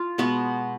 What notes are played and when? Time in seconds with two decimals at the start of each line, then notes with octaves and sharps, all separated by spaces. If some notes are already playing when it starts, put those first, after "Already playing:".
Already playing: F4
0.18 B2 G#3 B3 F#4